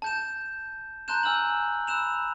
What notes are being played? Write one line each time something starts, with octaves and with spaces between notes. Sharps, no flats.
A5 G6 E7
A5 A#5 C6 F#6 G6 E7
G#5 E6 F6 G6 E7 F#7
B5 E6 F#6 E7 F7